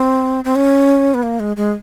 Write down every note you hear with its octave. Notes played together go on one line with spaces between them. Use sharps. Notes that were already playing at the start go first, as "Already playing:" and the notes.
Already playing: C4
C4
C#4
B3
A#3
G#3
G#3